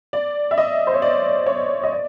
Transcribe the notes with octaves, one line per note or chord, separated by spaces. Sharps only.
D5
E5
D#5
C5
C#5
D5
C#5
D#5
D5